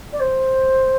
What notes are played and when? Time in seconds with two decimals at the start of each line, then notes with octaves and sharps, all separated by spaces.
0.13 D5
0.20 C5